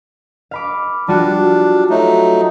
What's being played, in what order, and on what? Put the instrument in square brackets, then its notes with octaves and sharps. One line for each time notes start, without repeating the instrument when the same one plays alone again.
[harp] F5 B5 D6
[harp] G3 F4 F#4 [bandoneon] D4
[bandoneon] F#3 A3 D#4